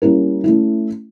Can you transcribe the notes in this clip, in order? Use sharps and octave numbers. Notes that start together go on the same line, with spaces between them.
G3 A#3 C#4 E4 A#4
A3 C#4 E4